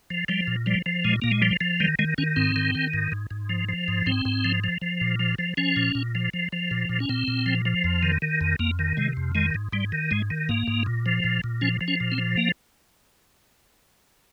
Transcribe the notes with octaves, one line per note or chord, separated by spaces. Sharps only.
F3
F3 G3
A#2
F3 G3
F3
A#2 G#3
A#2 A#3
G#3
F3 G3
F3
D#3 G3
D#3 G#3
D#3 C#4
G#2 C4
D#3
D#3
G#2
G#2
G#2
F3
F3
G#2
G#2 C4
G#2
F3
F3
F3
A#2
F3
F3
F3 C#4
A#2
A#2
F3
F3
F3
A#2
A#2
C#4
A#2 C4
A#2
F3
F3
F2
D#3
D#3
F2
F2 A#3
D#3
C3 G#3
F2
D#3 G#3
G#2
G#2 G3
D#3
G#2 G#3
D#3
G#2 A#3
G#2
A#2
F3
A#2
A#2
F3 C#4
F3
C#4
A#2
C4
F3
A#3